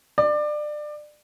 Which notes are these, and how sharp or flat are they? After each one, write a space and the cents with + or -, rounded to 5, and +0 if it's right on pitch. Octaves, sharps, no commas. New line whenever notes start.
D5 +25